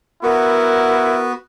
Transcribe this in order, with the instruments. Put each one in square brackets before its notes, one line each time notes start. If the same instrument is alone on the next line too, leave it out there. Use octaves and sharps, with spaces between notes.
[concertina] B3 F#4 [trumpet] E4 [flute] A#4